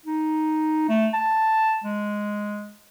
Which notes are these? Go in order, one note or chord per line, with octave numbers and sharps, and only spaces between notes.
D#4
A3
A5
G#3